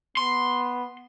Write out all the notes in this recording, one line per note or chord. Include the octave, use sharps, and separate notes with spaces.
B3 C6